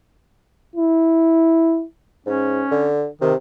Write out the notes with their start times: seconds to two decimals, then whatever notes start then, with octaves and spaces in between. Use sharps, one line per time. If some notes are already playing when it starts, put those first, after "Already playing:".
0.76 E4
2.26 G#2 C#4
2.71 D3
3.22 C3 D#3